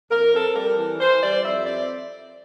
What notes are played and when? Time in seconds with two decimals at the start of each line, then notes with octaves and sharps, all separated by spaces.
0.10 F2 A#4
0.33 C4 A4
0.55 G3 A#4
0.77 E3
0.99 E3 C5
1.22 G3 D5
1.43 F2 E5
1.65 C4 D5